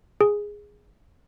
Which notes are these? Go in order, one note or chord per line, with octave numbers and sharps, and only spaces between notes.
G#4